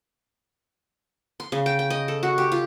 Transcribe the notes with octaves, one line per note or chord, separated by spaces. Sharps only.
C6
C#3
G5
G5
D#5
A4
F#4
G4
F4